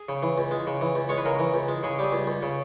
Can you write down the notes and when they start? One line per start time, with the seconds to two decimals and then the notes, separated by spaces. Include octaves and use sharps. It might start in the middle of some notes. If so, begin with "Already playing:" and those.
Already playing: G#4
0.09 C#3
0.23 E3
0.38 C#2
0.51 G#3
0.67 C#3
0.81 E3
0.95 C#2
1.09 G#3 C#5
1.18 B4
1.25 C#3 A#4
1.39 E3
1.54 C#2
1.68 G#3
1.83 C#3 G#4
1.99 G3 G#4
2.12 C#2
2.27 C#2
2.42 C#3